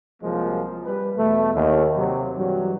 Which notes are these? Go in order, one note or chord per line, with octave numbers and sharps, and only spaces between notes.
C2 F3 F#3 G#3 A#3
G3 B4
E2 B2 A3
D#2
C3 F#3
G2 E3 F#3